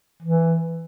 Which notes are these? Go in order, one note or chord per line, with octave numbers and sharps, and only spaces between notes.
E3